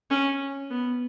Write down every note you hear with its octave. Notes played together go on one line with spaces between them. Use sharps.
C#4
B3